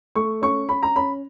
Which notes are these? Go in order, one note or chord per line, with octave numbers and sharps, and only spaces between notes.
A3 C#6
C#4 C#6
C#4 B5
A#5
C#4 B5